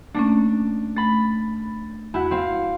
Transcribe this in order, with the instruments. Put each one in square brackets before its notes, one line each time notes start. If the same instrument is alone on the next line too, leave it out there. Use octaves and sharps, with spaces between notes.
[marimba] A3 A#3 C#4 [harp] D4
[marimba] A3 [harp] B5 A6
[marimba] E2 F#4 [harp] E4 F#5
[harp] C4 F5